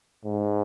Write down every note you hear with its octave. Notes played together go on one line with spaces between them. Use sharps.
G#2